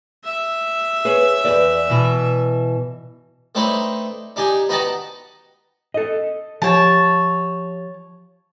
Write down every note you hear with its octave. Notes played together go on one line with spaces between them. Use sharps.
E5
G#4 B4 C#5
E2 B4 D5
B2 E3
A3 C4 D4 D#4 B4 C#5
D4 D#4 G4 G#5
B3 D#4 F#4 D#5 G5 A5
A4 D#5
F3 G4 C#5 A5